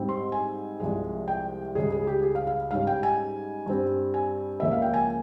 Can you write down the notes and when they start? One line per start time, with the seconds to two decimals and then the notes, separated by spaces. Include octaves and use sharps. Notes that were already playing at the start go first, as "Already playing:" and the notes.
Already playing: G#2 G3 C4
0.09 C6
0.32 G#5
0.80 C2 C3 F3 G#3
1.28 G5
1.75 C#2 C#3 G3 G#4
1.92 G#4
2.07 G4
2.23 G#4
2.35 F5
2.47 F5
2.71 G#2 G3 C#4 F5
2.87 G5
3.03 G#5
3.66 G2 G3 C4
4.14 G#5
4.60 C#2 C#3 F3 A#3 E5
4.71 F5
4.82 G5
4.94 G#5